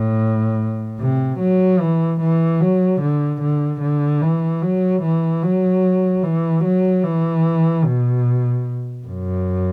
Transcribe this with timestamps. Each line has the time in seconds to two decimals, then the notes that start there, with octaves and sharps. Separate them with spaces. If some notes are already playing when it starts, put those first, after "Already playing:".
Already playing: A2
0.99 C3
1.40 F#3
1.80 E3
2.21 E3
2.60 F#3
3.01 D3
3.41 D3
3.81 D3
4.21 E3
4.62 F#3
5.02 E3
5.43 F#3
6.23 E3
6.64 F#3
7.04 E3
7.85 B2
9.06 F#2